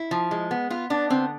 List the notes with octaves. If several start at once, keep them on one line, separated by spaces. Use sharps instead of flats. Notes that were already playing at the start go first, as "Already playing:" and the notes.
Already playing: E4
F3
G#3
B3
B3 F4
B3 D4
D3 C4